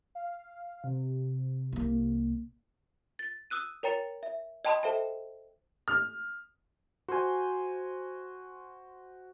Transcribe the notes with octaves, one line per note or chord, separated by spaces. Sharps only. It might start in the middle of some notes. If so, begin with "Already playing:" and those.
F5
C3
C2 A#3
A6
D#6 E6 F#6 D#7
A#4 C#5 G5 A#5 A6 C#7
E5
D#5 G5 A5 B5 C6 D#6
A4 C5 E5 G5 A5
F6
F#4 C5 G#5